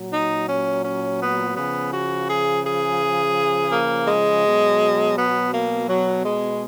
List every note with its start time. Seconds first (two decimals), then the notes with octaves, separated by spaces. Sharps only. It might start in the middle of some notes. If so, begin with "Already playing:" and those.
Already playing: A#2 F#3
0.12 D#4
0.47 C#4
0.83 C#4
1.20 B3
1.56 C#3 F3 B3
1.91 F#4
2.28 G#4
2.64 G#4
3.72 A#3
4.08 G#3
4.44 B2 F#3
5.17 B3
5.52 A#3
5.89 F#3
6.24 G#3